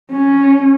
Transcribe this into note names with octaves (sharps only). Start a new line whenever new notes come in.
C#4